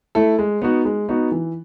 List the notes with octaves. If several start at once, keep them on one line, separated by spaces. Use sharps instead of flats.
A3 E4 A4
G#3
B3 D#4 F#4
G#3
B3 D#4 F#4
E3